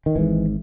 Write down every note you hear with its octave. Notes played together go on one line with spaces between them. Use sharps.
D#3
G#1 G#2 E3